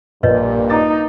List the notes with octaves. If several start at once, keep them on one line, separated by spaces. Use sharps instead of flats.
A#1 G2 A#2 B4 C#5 D#5
D#4 A#5 D6 A6